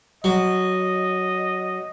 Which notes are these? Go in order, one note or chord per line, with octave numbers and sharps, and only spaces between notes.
F#3 D#5